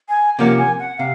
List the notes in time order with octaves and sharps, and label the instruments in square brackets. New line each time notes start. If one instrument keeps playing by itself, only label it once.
[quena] G#5
[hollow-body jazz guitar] C3 F3 A#3 C#4 [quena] F#5
[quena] G#5
F#5
[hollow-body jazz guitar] C3 [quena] F5